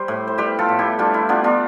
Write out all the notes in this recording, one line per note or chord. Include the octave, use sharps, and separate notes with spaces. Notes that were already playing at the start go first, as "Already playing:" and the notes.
Already playing: G3 C5
A2
C5
G3 G4 B4
F4 A4
A2
E4 G4
G3 D4 F4
E4
B3 D4 F4
D4 F4